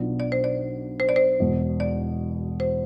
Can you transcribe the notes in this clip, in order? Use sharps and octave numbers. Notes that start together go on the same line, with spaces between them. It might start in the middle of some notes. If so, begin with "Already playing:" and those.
Already playing: B1 B2 B3 D4 F4
D5
C5
D5
C5
D5
C5
E1 E2 B2
D5
C5